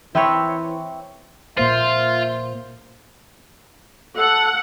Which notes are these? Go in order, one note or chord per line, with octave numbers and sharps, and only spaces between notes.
E3 C4 B4 C#5 E5 G5 E6
A#2 A#3 F4 C5 E5
A4 F#5